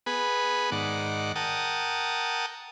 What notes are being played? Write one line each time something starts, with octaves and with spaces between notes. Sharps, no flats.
B3 G#4 B4
G#2 D#3 D5 F#5
A#4 F#5 G5 A5 D#6